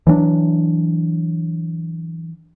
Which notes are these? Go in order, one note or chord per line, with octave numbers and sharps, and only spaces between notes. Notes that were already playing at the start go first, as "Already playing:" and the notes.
E3 F#3 C#4 D4